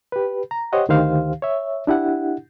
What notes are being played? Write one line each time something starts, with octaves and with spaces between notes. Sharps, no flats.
G4 B4
A#5
G4 C5 C#5 D#5 F#5
D2 D#3 G4 C5 F5
C#5 E5
D4 E4 G4 F#5